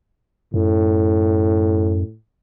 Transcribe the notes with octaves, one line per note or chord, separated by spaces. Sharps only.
F#2 A2